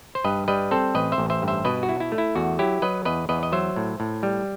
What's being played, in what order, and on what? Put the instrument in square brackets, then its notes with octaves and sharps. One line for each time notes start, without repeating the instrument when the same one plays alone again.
[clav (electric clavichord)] C5
G2 B4 D#5
G3 B4 D#5
C4 A4 C5
A1 B4 D#5
C5 E5
A1
C5 E5
G2
C5 E5
B2 B4 D#5
F#4
E4
E4
A3
E4
E2 F#4
F#3 E4 G4
F#3 B4 D#5
E2 B4 D#5
E2 B4 D#5
D#5
F#3 C5 E5
A2
A2
G3